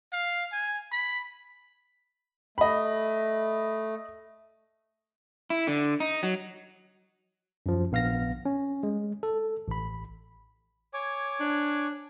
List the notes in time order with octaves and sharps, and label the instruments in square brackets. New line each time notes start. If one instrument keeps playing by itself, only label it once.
[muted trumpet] F5
G#5
B5
[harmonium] A3 [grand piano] D#5 B5
[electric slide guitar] E4
D3
D#4
F#3
[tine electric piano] F#2 F3
A#1 B3 F5 F6 A#6
C#4
G#3
A4
A1 B5
[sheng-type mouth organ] C#5 G#5 D6
[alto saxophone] D4